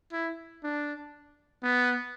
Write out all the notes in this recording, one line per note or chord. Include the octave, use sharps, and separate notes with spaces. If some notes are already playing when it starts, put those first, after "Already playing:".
E4
D4
B3